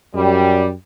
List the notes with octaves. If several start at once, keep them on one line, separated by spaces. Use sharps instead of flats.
F#2 G3